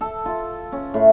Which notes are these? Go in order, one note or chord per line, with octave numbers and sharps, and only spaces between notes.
A4
F4
C#4
A2